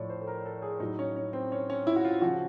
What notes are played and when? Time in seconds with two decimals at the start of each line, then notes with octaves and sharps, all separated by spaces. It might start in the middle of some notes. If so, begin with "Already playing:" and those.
Already playing: A2 F3 C#5 D5
0.10 C5
0.21 A4
0.27 A#4
0.46 A4
0.62 G#4
0.80 A2 F#3 D#4
0.99 C#4
1.16 C#4
1.33 C4
1.52 C#4
1.70 C#4
1.87 E4
1.96 F#4
2.05 F4
2.22 C#3 F3 F#4